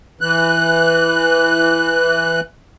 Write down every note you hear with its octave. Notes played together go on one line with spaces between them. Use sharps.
E3 F#6